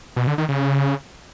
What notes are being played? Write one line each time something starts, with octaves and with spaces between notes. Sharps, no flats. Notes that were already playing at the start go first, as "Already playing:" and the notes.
B2
D3
D#3
C#3